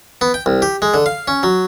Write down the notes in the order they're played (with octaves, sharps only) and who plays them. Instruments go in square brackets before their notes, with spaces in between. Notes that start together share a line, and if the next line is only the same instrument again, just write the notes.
[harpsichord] B3
G5
C2
G4
G#3
D3
F5
C#4
F#3